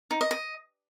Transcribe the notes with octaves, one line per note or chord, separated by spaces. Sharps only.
D#4
D#5
D#5